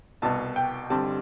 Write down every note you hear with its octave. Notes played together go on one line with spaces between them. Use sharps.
C2 B2 B3 A5
G5
G2 D3 G3 C4 A5